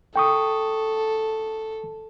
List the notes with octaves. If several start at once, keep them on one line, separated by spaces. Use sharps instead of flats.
A4 G5 C#6 D#6